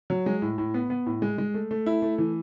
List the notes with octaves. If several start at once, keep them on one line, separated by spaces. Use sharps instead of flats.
F#3
G#3
A2
A2
B3
B3
A2
G#3
G#3
A3
A3
E4
A3
E3